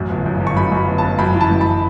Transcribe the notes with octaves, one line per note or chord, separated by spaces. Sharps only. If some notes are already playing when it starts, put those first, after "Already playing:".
Already playing: A1 F#2
G1
F#2
G1
C#6
F#2 B5
F#2 B5
G1
A5
G1
F#2 B5
E3
A5
F#2
B5